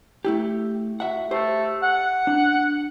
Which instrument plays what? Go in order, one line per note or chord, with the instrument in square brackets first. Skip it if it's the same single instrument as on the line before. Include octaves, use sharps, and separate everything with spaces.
[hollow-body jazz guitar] A3 E4 G4
F#4 E5 F#5
[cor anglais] A3 [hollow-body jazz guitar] G4 C5
[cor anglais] F#5
[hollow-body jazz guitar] D4